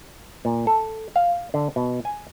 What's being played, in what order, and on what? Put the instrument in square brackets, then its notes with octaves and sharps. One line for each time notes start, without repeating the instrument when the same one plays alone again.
[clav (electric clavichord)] A#2
A4
F5
D3
B2
G#5